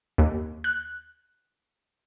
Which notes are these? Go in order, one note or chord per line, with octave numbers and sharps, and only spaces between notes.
D#2
F#6